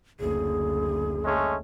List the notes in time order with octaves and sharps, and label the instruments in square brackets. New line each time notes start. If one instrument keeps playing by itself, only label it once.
[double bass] F#1 D2 [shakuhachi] G#4
[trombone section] G#3 A3 C#4